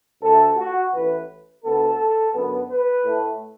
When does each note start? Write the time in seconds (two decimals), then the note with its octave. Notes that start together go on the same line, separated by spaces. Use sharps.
0.21 D2 D3 A3 A4
0.57 F#4
0.92 A1 A2 E3 A3 B4
1.63 D2 D3 B3 A4
2.34 F#2 D3 B3
2.69 B4
3.04 A2 A3